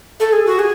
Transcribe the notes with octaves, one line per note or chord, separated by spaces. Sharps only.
A4
G#4
F#4
G#4